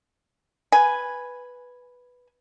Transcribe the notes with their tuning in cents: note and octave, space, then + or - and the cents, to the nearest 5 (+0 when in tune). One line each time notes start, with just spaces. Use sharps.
B4 +0 G#5 +0